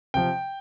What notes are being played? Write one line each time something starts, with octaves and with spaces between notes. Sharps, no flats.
C3 F3 G5